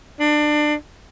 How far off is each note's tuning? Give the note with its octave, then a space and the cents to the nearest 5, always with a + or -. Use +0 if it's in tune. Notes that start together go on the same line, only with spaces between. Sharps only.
D4 +25